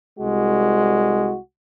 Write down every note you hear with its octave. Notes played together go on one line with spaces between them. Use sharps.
C2 G#3 F#4